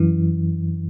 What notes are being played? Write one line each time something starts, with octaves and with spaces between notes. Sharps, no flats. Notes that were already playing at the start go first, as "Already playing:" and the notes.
Already playing: F#2 E3